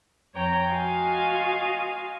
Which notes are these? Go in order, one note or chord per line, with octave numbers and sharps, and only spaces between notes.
F2 C#5 G5 A#5
F4 F#4 D#5 F5 G#5